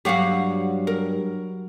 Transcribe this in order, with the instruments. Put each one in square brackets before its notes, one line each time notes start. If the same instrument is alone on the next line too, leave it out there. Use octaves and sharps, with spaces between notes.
[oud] G2 F#4 [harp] F#3 [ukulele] G4 F5 F#5
[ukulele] A#4